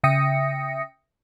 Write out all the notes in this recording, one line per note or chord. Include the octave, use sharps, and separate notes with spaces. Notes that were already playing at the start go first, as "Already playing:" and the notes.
C#3 E5 G5 D#6 A#6 C#7